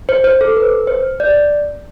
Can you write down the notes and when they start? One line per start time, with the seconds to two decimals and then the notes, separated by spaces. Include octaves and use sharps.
0.09 C5
0.24 C5
0.41 A4
0.57 B4
0.87 C5
1.20 D5